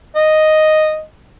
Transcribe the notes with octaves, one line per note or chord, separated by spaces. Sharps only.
D#5